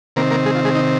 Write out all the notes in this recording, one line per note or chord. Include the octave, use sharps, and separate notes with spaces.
C3 D#3 A#3 C4 A#4
A#3 A#4
G#3 G#4
F4
G#3 G#4
D#4